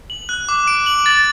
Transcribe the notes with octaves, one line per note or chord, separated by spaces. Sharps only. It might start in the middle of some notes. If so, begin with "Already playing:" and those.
F#7
F#6
D6
D7
F#7
A6